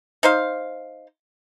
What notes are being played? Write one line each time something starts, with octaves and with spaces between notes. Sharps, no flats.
D#4 C5 F5